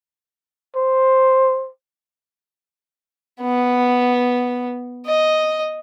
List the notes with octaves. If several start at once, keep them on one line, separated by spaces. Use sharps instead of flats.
C5
B3
D#5